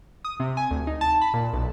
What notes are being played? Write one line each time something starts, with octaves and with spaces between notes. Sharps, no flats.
D#6
C3
G#5
D2
D#4
A5
B5
A#2
B1